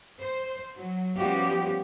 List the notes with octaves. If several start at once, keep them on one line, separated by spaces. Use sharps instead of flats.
C5
F#3
F3 G3 B3 C#4 F#4 G4